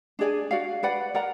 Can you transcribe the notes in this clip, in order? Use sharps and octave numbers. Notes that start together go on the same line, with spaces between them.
D4 G#4 D5 G#5
F#4 D5 F5
B4 D5 F#5 B5
A#4 D5 F#5 A#5